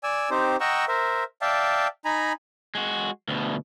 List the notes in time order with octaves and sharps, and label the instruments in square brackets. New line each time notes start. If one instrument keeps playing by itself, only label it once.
[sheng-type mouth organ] D5 G#5 E6
C4 D#4 G4 C5
D#5 F#5 G5 A#5 C#6 E6
A#4 C5 E5
D5 E5 F5 G5 A5
D#4 G#5 A#5 B5
[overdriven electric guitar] G#3 F#4
D2 B2